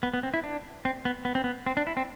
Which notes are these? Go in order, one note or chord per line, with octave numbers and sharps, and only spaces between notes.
B3
B3
C4
E4
D4
C4
B3
B3
C4
B3
C4
D4
E4
C4